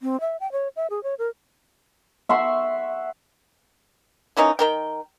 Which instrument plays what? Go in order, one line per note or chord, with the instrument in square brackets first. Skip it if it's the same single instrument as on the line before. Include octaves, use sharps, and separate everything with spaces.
[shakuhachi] C4
E5
G5
C#5
E5
G#4
C#5
A#4
[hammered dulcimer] E5 F#5 C6 C#6
[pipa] E3 A#3 C#4 D#4
D#3 A#4 G5